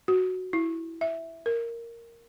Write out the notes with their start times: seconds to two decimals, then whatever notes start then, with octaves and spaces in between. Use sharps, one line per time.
0.08 F#4
0.53 E4
1.01 E5
1.46 A#4